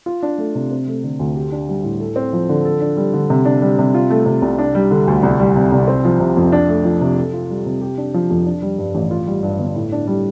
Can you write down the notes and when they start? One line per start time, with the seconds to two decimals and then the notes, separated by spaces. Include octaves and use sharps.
0.06 F4
0.23 D4
0.38 A3
0.55 C3
0.71 C4
0.88 A3
1.04 D3
1.20 D2
1.35 G4
1.52 D4
1.69 G3
1.84 A2
2.00 A4
2.16 C4
2.33 F3
2.49 D3
2.65 A4
2.81 D4
2.97 G3
3.14 D3
3.30 C3
3.45 D4
3.62 G3
3.79 C3
3.94 F4
4.10 A3
4.26 C3
4.42 C2
4.59 D4
4.75 G3
4.91 D3
5.08 D2
5.23 C2
5.40 G3
5.56 C3
5.72 C2
5.88 C4
6.05 F3
6.20 C3
6.37 F2
6.52 D4
6.69 A3
6.85 F3
7.01 C3
7.17 A4
7.33 F4
7.50 G3
7.66 C3
7.81 G4
7.98 D4
8.14 F3
8.30 F2
8.46 D4
8.62 G3
8.78 G2
8.95 A1
9.11 F4
9.27 G3
9.43 G2
9.59 G1
9.75 A2
9.92 D4
10.07 G3